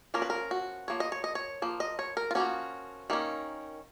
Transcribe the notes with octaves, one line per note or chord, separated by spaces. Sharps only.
F3 A#3 C#4 A#4
B4
A#4
F#4
F3 A#3 C#5
D#5
C#5
D#5
C#5
F3 A#3
D#5
C#5
A#4
F4
F3 A#3 C#4 F#4
D#3 A#3 C#4